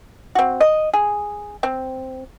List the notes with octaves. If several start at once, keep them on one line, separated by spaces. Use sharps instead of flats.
C4 F#4
D#5
G#4
C4